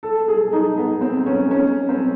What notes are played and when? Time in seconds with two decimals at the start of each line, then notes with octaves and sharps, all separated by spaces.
0.03 A4
0.28 G#4
0.53 D#4
0.78 B3
1.01 C4
1.26 C#4
1.51 C#4
1.89 C4